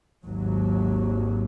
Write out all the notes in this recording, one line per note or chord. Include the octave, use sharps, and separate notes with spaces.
G#1 D#2 F#3